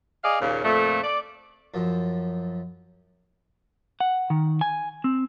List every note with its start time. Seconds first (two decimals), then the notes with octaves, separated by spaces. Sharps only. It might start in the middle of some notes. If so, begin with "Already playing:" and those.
0.24 G#4 D5 D#5 F5
0.41 D#2 A#2 C#3
0.64 F2 A#2 A3
1.04 D5
1.74 F#2 F3
4.00 F#5
4.30 D#3
4.61 G#5
5.04 C4